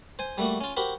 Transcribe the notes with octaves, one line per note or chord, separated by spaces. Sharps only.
C5 G#5
G3 A3 A#3 F#4
C#4 F4
F#4 G4 A#4 C5 B5